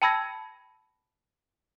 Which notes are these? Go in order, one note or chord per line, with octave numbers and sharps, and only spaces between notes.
G5 A5 B5 E6 G#6 A#6